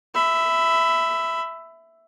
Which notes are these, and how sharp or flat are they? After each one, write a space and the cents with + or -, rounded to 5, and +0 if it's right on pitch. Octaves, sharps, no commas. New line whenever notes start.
E5 +0 B5 +25